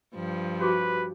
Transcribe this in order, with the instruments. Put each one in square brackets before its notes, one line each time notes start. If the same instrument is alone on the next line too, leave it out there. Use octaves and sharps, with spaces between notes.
[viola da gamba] G2 F3
[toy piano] F#4 G4 D6 [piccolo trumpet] B4